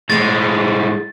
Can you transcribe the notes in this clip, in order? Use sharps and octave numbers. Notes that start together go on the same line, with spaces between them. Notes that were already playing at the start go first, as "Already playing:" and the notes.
A2 G#3 A6